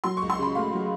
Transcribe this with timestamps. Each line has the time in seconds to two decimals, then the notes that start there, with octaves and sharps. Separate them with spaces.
0.04 F#3 C6
0.17 C#6
0.22 C#2
0.30 C6
0.39 C#3 B5
0.55 A3 F5
0.73 F#3